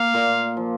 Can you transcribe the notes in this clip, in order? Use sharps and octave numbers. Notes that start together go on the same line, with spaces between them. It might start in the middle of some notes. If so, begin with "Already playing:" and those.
Already playing: A#3 F5
A#2
F3